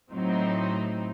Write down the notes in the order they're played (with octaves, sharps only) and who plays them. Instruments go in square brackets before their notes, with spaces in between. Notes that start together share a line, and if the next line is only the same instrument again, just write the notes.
[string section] A2 F#3 C4 D#4